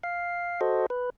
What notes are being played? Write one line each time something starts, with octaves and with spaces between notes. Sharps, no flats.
F5
F#4 A4 C5 D#5
B4